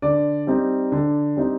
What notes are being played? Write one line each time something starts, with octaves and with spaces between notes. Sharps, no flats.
D3 D5
G3 C4 D#4
D3
G3 C4 D#4